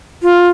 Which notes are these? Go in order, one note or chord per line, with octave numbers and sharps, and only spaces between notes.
F4